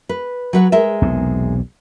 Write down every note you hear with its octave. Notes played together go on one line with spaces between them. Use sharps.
B4
F#3 B4 F#5
G#3 A#4 E5
B1 E2 C3